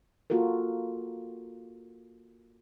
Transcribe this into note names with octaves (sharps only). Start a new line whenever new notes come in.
A#3 F4 F#4 A4 A#4